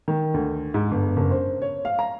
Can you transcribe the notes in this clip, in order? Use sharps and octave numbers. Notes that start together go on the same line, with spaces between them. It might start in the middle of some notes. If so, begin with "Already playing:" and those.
D#3
D2
G#2
G1
F#1
C5
C#5
F5
A#5